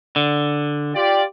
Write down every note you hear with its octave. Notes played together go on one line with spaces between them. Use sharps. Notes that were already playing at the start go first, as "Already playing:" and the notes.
D3
F4 G4 D5